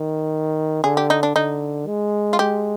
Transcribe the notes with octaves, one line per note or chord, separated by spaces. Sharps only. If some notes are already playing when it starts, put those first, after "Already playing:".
Already playing: D#3
D3 G#4
G4
D#4
D4
D3 D#4
G#3
F4
G#3 G4